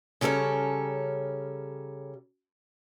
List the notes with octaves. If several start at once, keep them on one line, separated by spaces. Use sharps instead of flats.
C#3 G3 C#4 A4 A#4